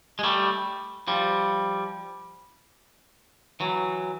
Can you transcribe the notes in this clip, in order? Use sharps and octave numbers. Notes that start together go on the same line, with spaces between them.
G#3
G3 A3
F3 G3
E3 F#3